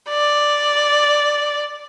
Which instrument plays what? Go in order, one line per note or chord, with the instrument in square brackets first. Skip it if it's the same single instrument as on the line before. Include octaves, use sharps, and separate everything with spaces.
[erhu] D5